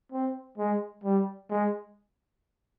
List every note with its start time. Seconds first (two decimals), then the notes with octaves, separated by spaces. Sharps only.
0.12 C4
0.58 G#3
1.04 G3
1.50 G#3